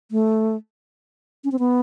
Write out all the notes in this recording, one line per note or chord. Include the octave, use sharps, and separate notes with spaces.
A3
C#4
C4
B3